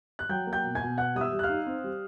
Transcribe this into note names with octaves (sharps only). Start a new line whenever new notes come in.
F#6
F#3 G5 G6
A#3
G5 G6
B2
G#5 G#6
B2
B3 F#5 F#6
G3 D#6
E5 E6
G3
F#6
F5 F6
D#4
C4
G3